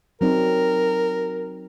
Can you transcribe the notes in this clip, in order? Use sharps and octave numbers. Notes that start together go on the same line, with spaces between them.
F#3 C4 D#4 A#4